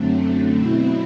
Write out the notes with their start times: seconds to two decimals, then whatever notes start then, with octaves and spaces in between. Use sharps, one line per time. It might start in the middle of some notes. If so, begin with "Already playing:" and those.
Already playing: F#2 D3 F#3 A3 C4
0.56 B2 F#3 C4 E4